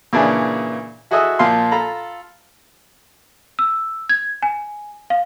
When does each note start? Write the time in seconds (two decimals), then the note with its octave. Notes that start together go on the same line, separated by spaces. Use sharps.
0.13 A#2 C#3 E3 D4 E4 G#4
1.11 E4 F#4 G#4 A4 D#5 E5
1.39 A#2 F3 F4 C6
1.71 F4 A4 A#5 B5
3.59 E6
4.09 G#6
4.43 G#5
5.10 F5